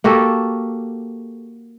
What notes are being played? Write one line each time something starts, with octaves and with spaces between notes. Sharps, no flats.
A#3 F#4 G4 A4